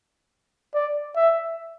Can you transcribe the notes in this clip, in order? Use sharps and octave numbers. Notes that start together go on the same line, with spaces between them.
D5
E5